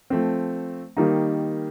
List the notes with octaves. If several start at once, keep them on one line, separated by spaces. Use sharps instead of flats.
F3 A3 C4
D#3 G3 A#3 D#4